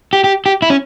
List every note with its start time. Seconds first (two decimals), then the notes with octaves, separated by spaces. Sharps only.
0.13 G4
0.24 G4
0.46 G4
0.62 E4
0.70 C#4